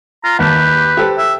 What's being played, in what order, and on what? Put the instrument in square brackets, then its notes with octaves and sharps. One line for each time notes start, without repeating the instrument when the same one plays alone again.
[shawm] F4 [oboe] A#5
[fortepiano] D#2 A5 [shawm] G4 [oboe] B4
[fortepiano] G4 A4 C5
[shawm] E5